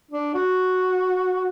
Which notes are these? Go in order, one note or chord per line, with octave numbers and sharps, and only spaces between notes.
D4
F#4